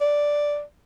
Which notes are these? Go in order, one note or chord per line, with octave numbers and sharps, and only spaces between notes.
D5